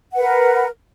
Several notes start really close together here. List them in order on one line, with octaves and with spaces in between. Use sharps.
F#5 B4 A#4